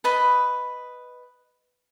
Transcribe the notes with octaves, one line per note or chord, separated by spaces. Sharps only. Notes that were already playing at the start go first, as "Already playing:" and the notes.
B4 D#5 B5